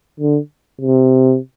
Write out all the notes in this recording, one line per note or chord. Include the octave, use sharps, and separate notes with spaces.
D3
C3